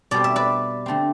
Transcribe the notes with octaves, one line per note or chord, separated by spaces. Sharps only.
B2 G3 C4 D5
E5
B4 D5
D3 A3 C4